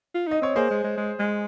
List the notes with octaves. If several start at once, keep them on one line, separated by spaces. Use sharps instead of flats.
F4
D#4 D#5
C4 C#5
A#3 G#4 C5
G#3
G#3
G#3
G#3